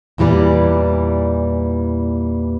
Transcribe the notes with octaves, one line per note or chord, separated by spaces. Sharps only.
E2 A#2 E3 G3 D5